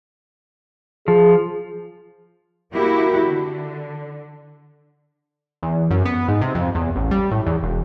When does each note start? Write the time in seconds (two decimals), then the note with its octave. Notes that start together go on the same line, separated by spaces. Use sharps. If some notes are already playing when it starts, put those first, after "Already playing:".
1.08 F3 G#4
2.72 A#3 E4 F#4 G4
3.26 D3
5.63 E2
5.90 F#2
6.05 B3
6.28 G#2
6.41 C3
6.55 F2
6.75 E2
6.96 A1
7.11 G3
7.31 A2
7.46 E2
7.63 E1